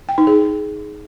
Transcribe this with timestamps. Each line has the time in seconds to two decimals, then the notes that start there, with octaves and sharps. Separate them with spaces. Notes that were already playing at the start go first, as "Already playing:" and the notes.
0.09 G5
0.18 D#4
0.27 G#4